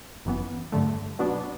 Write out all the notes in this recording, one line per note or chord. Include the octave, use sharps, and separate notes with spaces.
G1 F#2 E3 B3
G2 D3 A3
B2 F#3 B3 D4